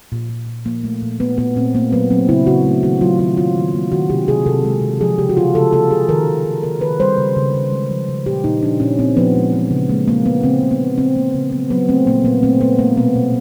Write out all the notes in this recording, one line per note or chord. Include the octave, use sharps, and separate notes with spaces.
A#2
A#2
A#2
F3 A#3
A3
A#2
A3 B3
A#2 B3
A#2 C4
A3 A#3
F#3 B3
F#3 C4
C#3 E4
C#3 F#4
A3
D#3 F#4
F#3 F4
D#3 F4
D#3 F4
D#3
A#3
D#3 F#4
C3 G4
C3 G#4
C3 A4
G#3
C3
F3 G#4
C#3 G4
F#4
C#3 F4
C#3 A4
A#3 A4
C#3 G#4
D#3 A#4
D#3
D#3
D#3 A#4
D#3 B4
G3 C5
C#3
C#3
C#3
G#3
F3
C#3
A#2 G4
A#2 D#4
F3 D4
A#2 C#4
A#2 C4
F3 B3
G#3
E3
C#3
G#3 A#3
G#3 A#3
G#3 B3
C#3 C4
C#3
B3
A#3
C#3 C4
A#3
C#3
F#3 B3
F#3 B3
A3 C4
A#2 A#3
A#2 B3
A3 C4
G#3 B3
G#3 A#3
B2 B3
B2